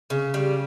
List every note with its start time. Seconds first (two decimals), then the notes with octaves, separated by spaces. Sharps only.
0.10 C#3
0.34 G3